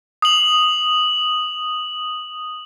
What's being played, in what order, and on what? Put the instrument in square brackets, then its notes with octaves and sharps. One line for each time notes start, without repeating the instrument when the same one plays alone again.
[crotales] D#6 F#7